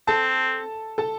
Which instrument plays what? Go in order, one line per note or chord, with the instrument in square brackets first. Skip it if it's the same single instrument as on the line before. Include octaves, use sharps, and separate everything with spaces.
[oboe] C4 [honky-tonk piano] A4 A5
[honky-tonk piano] A4 A5